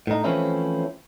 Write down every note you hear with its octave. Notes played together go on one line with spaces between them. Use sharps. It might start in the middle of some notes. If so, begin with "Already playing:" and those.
A2 D#4
E3 F3 A3 C4 C#4 E4